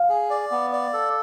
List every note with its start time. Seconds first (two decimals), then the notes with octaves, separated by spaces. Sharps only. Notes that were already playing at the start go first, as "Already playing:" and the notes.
Already playing: F5
0.09 G#4
0.30 D5
0.51 B3
0.73 D5
0.93 A4